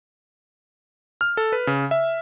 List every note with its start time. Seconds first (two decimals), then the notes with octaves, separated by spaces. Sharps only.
1.21 F6
1.37 A4
1.52 B4
1.67 C#3
1.91 E5